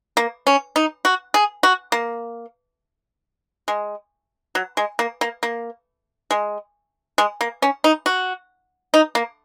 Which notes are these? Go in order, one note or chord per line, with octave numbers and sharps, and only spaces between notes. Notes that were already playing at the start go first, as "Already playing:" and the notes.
A#3
C#4
D#4
F#4
G#4
F#4
A#3
G#3
F#3
G#3
A#3
A#3
A#3
G#3
G#3
A#3
C#4
D#4
F#4
D#4
A#3